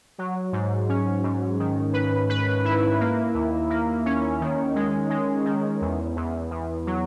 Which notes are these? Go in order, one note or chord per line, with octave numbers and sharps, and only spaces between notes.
F#3
G#2
C#4
G#2
D#3
B4
B4
E4
A#3
D#2
A#3
C#4
D#3
G#3
G#3
D#3
E2
E2
E2
F#3